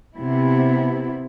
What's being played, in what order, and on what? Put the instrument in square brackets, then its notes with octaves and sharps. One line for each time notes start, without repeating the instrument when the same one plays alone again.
[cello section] C3 B3 E4